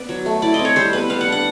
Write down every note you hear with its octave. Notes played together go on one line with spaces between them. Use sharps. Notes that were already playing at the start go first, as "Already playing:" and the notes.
Already playing: B3 D5
F#3
A3
E4 D5
D#5
C4
C#5
G3 C5
B3 B4
G3 F5
F#5
D4
F#5